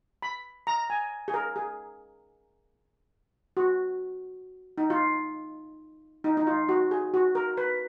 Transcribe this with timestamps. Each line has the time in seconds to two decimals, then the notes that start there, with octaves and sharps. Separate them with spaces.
0.22 B5
0.67 A#5
0.90 G#5
1.28 G#4
1.34 A#4
1.56 G#4
3.57 F#4
4.78 D#4
4.90 F4
6.24 D#4
6.37 D#4
6.47 F4
6.69 F#4
6.91 G#4
7.14 F#4
7.35 A#4
7.57 B4